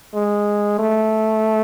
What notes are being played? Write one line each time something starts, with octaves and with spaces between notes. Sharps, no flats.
G#3
A3